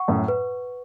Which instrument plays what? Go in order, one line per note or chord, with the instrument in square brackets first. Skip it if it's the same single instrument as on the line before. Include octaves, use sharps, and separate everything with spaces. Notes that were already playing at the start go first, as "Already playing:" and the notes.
Already playing: [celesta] F#5 C#6
[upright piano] F#2 A2
[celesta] B4